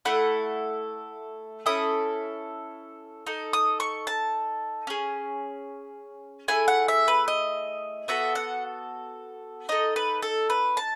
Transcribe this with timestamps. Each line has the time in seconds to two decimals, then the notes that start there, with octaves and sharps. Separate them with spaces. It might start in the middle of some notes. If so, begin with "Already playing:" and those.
0.05 A3 E4 A4 F#5
1.66 C#4 E4 A4 D#6
3.27 D#4 A4
3.53 D#6
3.80 C#6
4.07 A5
4.87 C#4 G#4
6.48 A3 E4 G#4 G#5
6.68 F#5
6.88 E5
7.08 B4
7.28 D#5
8.08 B3 F#4 A4 E5
8.35 F#5
9.69 D#4 A4 D#5
9.96 B4
10.22 A4
10.50 B4
10.77 A5